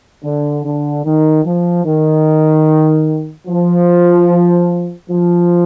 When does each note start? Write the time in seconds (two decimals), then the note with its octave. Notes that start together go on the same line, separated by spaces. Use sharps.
0.24 D3
0.65 D3
1.05 D#3
1.45 F3
1.85 D#3
3.47 F3
5.09 F3